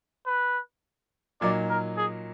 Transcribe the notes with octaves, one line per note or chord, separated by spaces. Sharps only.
B4
A#2 F#3 A#3 D#4 D5
A#4
G#4